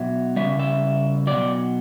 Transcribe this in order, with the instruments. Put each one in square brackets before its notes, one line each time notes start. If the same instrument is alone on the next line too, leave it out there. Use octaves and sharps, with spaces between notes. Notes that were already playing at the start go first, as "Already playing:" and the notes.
Already playing: [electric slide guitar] B2 F#3 E5
C#3 G3 E5
E5
B2 F#3 D5